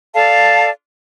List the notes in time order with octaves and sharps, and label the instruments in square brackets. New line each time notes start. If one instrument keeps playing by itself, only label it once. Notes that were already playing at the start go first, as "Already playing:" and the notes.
[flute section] A4 D5 F5 A5